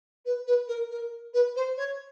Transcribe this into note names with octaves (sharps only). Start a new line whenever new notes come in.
B4
B4
A#4
A#4
B4
C5
C#5